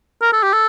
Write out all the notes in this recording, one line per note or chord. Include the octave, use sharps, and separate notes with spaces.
A#4
A4
G4
A4